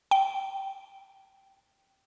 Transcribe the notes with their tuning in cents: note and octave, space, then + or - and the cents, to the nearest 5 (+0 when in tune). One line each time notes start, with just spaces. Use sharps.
G5 -15